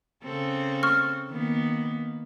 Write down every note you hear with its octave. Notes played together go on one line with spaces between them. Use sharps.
C#3 C4 A4
C#6 F6
D#3 A#3 B3